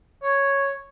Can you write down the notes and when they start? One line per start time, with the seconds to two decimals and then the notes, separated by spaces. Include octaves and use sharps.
0.23 C#5